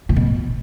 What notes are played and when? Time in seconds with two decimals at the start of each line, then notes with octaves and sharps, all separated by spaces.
0.09 A#2
0.16 B2